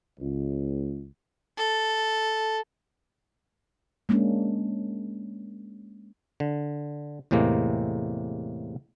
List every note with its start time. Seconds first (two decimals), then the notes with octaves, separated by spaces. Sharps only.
0.19 C#2
1.58 A4
4.09 G#3 A#3 C#4 D4
6.40 D3
7.31 E2 A2 C3 G#3 A#3